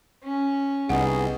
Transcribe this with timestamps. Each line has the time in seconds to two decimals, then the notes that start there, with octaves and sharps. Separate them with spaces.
0.23 C#4
0.89 C2 B3 D#4 G#4 D#5 F#5